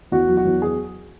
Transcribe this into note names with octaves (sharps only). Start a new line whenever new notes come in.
E2 F#4
F#3
F#4
E2
F#3 G#4